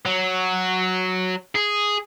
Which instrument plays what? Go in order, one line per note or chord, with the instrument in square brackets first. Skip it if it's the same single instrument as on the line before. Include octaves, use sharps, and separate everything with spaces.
[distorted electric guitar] F#3
G#4